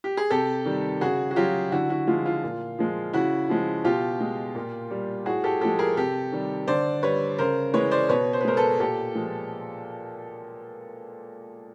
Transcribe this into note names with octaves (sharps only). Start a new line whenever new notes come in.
G4
G#4
C3 G4 A4
D#3 G3
C#3 F#4 G#4
F#4
F#3 F4 G4
D3 E4 F#4
E4 F#4
F3 G#3 F4
F4
A#2
F3 G#3
C#3 E4 F#4
F3 G#3
B2 F4 G4
G#3
A#2
G3
A2 F#4 G#4
G4 A4
F3 G#3 G4 A4
G#4 A#4
C3 G4 A4
D#3 G3
D3 C5 D5
G3 B4 C#5
C#3 A#4 C5
E3 G#3 B4 C#5
C5 D5
B2 B4 C#5
C5
B4
G#3 A#4 C5
A4 B4
A#2 G4 A4
F3 G#3